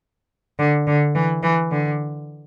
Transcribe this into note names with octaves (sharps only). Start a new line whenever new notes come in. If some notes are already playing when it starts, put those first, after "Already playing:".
D3
D3
E3
E3
D3